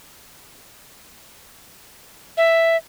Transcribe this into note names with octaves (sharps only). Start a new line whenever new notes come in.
E5